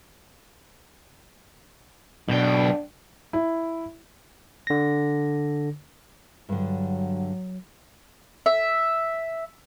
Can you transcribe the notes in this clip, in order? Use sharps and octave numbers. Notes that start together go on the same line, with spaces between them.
B1 B2 D4 G5
E4
D3 A#6
G2 D3 F#3
E5